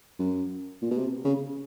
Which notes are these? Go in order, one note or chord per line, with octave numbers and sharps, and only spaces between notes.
F#2
A#2
B2
C3
C#3